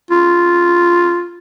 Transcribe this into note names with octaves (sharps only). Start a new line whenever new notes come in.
F4